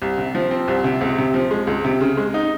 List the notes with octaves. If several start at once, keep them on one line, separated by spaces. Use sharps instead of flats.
C2
C3
F3
C4
C2
C3
C#2
C3
F3
G#3
C#2
C3
C#3
G#3
D#4